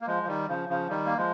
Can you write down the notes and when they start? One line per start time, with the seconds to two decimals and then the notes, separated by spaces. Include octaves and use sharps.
0.01 A#3
0.07 F3 G#3
0.23 F3
0.27 D#3 G3
0.48 C#3 F3
0.69 C#3 F3
0.89 D#3 G3
1.06 A#3
1.17 F3 G#3